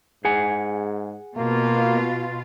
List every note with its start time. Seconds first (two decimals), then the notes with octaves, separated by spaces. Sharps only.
0.25 G#2 G#4 F#5 G#5
1.37 B2 A#3 F4